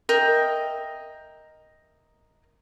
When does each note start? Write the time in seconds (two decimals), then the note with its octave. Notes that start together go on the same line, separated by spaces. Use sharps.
0.09 A#4 D#5 E5 G5